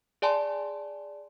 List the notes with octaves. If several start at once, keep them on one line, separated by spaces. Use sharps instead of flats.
G#4 D5 G#5 A5 C6